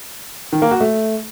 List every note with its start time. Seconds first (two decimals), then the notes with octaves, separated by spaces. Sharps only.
0.53 D#3
0.62 A#3
0.71 F#4
0.81 A3